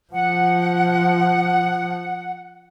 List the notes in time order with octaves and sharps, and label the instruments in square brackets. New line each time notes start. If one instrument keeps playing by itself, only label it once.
[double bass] F3 [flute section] F#5